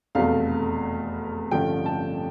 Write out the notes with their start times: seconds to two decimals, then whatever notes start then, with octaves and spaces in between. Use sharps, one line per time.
0.15 F1 E2 B2 A3 F5
1.51 A1 G2 D3 F3 A3 G5
1.86 A5